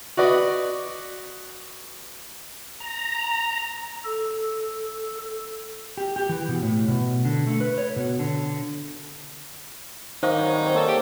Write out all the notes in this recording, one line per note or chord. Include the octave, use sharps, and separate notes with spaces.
F#4 B4 D5 D#5
A#5
A4
G4
G4
E3
B2
A2
B2
D3
A3
B4
C#5
B2
D3
D#3 D#4 C5 F5 D6
F#3 G3 C#5
C4 C#5
A#3 A4 A5
G4